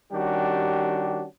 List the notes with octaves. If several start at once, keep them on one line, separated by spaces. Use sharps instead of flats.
D#3 G3 C#4 D4 F#4 G4